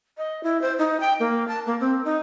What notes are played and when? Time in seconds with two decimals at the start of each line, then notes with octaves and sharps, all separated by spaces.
0.17 D#5
0.43 E4
0.61 C5
0.78 D#4
1.00 G5
1.19 A#3
1.48 A5
1.66 A#3
1.80 C4
2.05 D#4